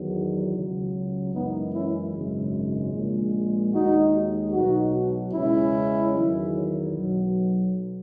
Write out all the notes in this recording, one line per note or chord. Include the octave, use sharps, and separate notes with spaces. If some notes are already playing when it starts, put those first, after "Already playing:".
Already playing: E2 D#3 F#3
C#2 C#3 F#3
F#2 E3 G#3 B3 D#4
C#4 E4
G#1 F#2 C#3 G#3
A#1 A#2 G#3
D#2 D#3 G#3 D#4 F#4
B1 B2 F#3 D#4 F#4
E2 C#3 G#3 C#4 E4
E2 D#3 F#3
B1 B2 F#3